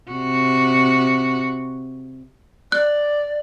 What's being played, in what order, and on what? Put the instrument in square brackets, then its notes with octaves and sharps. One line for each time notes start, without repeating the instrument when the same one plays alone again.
[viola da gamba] C3 F#4
[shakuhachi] D5 [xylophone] F#6